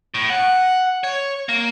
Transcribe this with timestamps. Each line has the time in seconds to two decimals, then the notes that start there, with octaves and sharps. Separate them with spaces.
0.14 A2
0.30 F#5
1.04 C#5
1.49 A#3